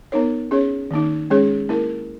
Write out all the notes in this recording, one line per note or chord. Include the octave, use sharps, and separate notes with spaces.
B3 D#4 A#4 C#5
C#4 G#4 C#5
D#3 A#3 D#4
G#3 C#4 G#4 C#5
A#3 E4 A#4